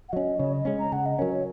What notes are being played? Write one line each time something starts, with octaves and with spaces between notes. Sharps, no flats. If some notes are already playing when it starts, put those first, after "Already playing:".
F#5
F#3 C#4 D#5
C#3 C#5
D#5
G#3 C#4
A#5
C#3 F#5
D#5
F#3 C#4 A#4
C#5